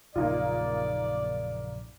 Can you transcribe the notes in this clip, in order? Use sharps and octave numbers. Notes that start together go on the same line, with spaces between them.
A#1 F#2 C#3 A#3 D#4 F4 D5